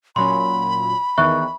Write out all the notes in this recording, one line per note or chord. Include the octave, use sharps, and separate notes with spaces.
A#2 F#3 C#4 B5 C6
E2 D#3 E5 C#6 F#6